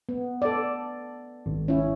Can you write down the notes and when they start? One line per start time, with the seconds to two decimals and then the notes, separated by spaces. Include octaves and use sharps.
0.09 B3
0.42 A4 D5
1.46 G#1
1.68 C#4 E4